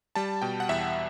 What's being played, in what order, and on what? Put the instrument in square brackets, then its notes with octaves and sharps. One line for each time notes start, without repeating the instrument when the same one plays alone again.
[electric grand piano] G3 A5
B2 G5
F#5
E2 E5